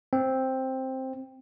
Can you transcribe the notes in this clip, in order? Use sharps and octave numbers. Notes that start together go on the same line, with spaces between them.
C4